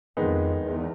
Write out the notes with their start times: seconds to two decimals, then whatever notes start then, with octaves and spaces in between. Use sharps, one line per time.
0.17 F2 D#3 G#3 B3 D#4
0.64 E2